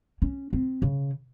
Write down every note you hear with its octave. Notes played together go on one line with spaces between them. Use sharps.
C#4
C4
C#3